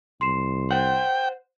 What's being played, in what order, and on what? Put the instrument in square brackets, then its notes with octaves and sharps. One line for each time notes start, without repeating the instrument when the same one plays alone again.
[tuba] C2 [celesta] C6 C7 E7
[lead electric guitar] C5 F#5 [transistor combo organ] G5